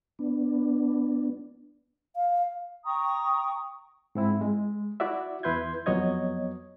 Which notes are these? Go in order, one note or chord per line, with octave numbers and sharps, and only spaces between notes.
B3 D4
F5
G5 A#5 C#6 D#6
G#2 C4 E4
G#3
E4 F#4 D5 E5
E2 E4 B4 C6 G6 G#6
F2 F#3 B3 C#5 D#5 G#6